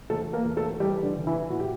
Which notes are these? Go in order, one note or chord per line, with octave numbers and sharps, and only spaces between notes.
E2 A3 A4
A#3 A#4
E2
A3 A4
E3 G3 G4
D3 D4
E3
E3 E4
A2 F#4
G4